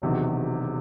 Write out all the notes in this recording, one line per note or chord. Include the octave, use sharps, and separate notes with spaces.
E1 E2 C3 D#3 F#3